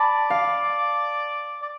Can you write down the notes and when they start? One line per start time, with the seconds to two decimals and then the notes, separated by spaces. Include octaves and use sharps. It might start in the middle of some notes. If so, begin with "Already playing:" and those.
Already playing: D5 A5 B5
0.30 F5
1.62 D5